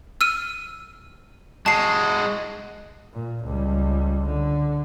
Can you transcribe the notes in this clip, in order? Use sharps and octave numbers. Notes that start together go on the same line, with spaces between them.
E6 F6 D#7
G#3 F#4 A5 C7
A#2
C#2 G3
D3